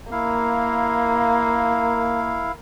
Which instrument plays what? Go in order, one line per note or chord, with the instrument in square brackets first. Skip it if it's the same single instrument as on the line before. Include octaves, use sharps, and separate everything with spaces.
[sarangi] A#3 [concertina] E4 F5